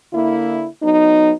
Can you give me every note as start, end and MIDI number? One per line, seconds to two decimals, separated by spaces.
0.13 0.66 50
0.13 0.66 58
0.13 0.66 64
0.83 1.32 54
0.83 1.32 59
0.83 1.32 63